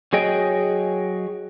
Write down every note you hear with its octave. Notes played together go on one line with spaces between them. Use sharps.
F#3 G#4 C#5 D#5 G5